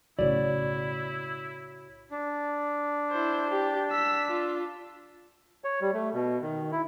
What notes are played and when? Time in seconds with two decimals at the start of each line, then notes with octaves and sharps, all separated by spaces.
0.19 B1 A2 C#3 E4 F#4 C#5 D5
2.11 D4
3.11 E4 C5
3.50 G4
3.91 E6 B6
4.31 F4
5.64 C#5
5.81 G3
5.94 A3
6.14 B2
6.42 D#3
6.72 E4